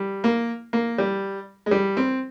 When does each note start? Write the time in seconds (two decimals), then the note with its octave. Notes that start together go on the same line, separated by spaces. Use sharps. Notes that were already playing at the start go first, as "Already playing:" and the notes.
Already playing: G3
0.24 A#3
0.73 A#3
0.98 G3
1.66 G#3
1.71 G3
1.97 C4